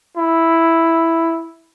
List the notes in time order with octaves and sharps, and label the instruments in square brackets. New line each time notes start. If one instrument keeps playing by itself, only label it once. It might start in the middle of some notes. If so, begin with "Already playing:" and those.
[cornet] E4